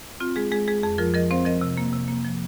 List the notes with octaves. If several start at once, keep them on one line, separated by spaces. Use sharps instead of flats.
C4 F4
G#3 G#4
G#3 G#4
G#3 G#4
F2 G#4
F3 F4 A#4
F3 A#4 D#5
C4 C5 F5
F3 A#4 D#5
C3
A#3
C3
A#3
F3